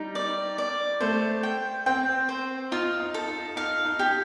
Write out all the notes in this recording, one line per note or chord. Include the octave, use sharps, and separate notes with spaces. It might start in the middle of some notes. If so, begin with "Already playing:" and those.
Already playing: G3 D#4
D5
D5
A3 C5
G5
C4 G5
C5
D#4 F4
D#4
A4
D#4
D#4 F5
D#4
G4